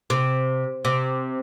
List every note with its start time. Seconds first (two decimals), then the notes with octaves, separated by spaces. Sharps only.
0.10 C3
0.85 C3